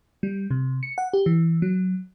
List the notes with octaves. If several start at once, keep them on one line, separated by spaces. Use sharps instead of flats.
G3
C3
C#7
F#5
G4
E3
F#3